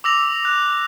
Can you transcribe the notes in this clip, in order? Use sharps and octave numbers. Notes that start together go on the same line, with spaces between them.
D6 E6 A#6 F7
F#6